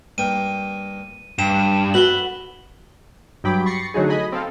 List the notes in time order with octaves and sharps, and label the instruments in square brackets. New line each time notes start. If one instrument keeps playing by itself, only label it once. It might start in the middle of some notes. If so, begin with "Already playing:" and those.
[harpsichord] G2 A#3 G5 [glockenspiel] D#7
[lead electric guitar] G2 [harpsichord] G4 A#5 [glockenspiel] E7
[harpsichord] E4 A4 E5 [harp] F#4 B4 F#5 [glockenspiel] F#7 G7
[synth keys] G2 F#3 G5 B5 D6
B5 C#6 A6 A#6 C7 C#7
D3 F#3 A3 D#4 F#4 G#4
D#5 G#5 B5
C4 A4 F5